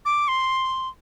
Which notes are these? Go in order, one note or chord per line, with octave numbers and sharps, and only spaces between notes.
D6
C6